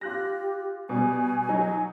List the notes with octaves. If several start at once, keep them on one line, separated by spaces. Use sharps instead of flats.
F4 G4 F#6 A#6
B2 G3 G#5
F#3 D#4